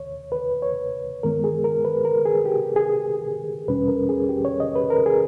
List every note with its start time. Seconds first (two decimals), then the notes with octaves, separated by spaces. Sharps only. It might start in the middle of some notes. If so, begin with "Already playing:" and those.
Already playing: D#2 C#5
0.32 B4
0.62 C#5
1.23 G2 D#3 G#3 B3 A#4
1.44 G#4
1.64 A#4
1.85 B4
2.05 A#4
2.25 G#4
2.46 G4
2.76 G#4
3.68 E2 B2 G3 C#4 B4
3.88 A#4
4.09 G#4
4.29 G4
4.45 C#5
4.60 D#5
4.76 B4
4.90 A#4
5.06 G#4